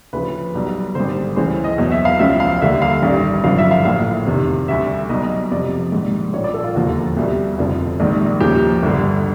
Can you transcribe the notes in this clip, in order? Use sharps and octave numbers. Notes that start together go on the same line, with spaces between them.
D2 C#3 F3 B4
B1 B2 G3
G#1 G2 D3 C5
C#2 C#3 E3 C5
D#5
E2 B2 F#3
E5
F5
C#2 C#3 F3 E5
F5
D#2 D3 G3 E5
F5
A1 G2 D#3 G3
G1 F#2 D3 F3 F5
E5
F5
A#1 A2 F3 F5
F1 E2 C3 D#3
D2 D3 G3 E5
B1 B2 G3 D#5
D#5
F2 C3 F3 D5
A#1 G#2 D#3 G3
A#1 A#2 F3 C#5
D5
A4
F4
E1 D#2 D3 F3 F#4
C2 B2 G3
F1 F2 D3 F3
A#1 G#2 D#3 G3
D#2 C#3 F3 G4
G1 G2 D3